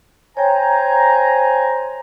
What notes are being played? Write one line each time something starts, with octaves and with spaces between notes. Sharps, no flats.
C5 C#5 G5 G#5 A#5